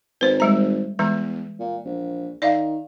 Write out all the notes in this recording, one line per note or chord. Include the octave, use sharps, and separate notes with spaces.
G#1 B4 C5
G3 G#3 A#5
E2 E3 G#3 A#5
A#2
A#1
D#3 D5 E5 F5